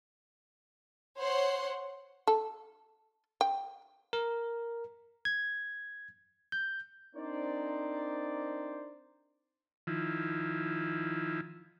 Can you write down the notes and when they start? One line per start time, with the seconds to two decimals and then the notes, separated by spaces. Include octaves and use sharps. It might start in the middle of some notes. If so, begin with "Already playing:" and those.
1.18 C5 C#5 F#5 C6
2.27 A4
3.41 G5
4.13 A#4
5.25 G#6
6.52 G6
7.16 C4 D4 D#4 A#4 C5 D5
9.87 D#3 F3 E4